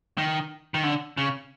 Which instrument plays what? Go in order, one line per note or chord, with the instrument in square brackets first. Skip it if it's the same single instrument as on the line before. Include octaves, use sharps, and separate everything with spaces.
[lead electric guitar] D#3
D#3
D3
C#3